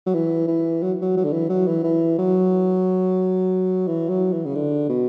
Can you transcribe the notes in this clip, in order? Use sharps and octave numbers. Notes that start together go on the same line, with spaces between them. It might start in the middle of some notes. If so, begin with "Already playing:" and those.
F#3
E3
E3
F#3
F#3
F#3
D3
E3
F#3
E3
E3
F#3
E3
F#3
E3
C#3
D3
B2